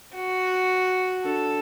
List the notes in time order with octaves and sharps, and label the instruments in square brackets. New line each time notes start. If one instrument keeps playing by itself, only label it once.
[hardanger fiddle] F#4
[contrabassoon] D3 [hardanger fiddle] A4